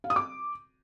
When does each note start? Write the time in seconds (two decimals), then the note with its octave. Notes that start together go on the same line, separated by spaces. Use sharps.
0.04 F5
0.10 D#6
0.16 D6